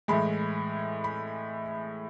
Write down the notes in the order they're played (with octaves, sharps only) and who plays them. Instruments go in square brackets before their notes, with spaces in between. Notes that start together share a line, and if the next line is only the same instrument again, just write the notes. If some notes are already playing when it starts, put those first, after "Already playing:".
[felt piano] A2 E3 G#3 B5
B5